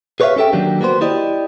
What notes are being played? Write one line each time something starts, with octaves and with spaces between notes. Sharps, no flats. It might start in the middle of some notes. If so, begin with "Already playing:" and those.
G#4 B4 C#5 D5 E5 F5
C#4 G4 A4 E5 G5
D#3 F#3 A#3 D4 G4
A#3 B3 F#4 C5
E4 G4 D5 D#5